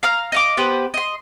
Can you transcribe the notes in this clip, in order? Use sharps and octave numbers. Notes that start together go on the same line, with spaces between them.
F5 A#5 F6
D#5 F5 D6
B3 G4 B4 C5
D#5 C6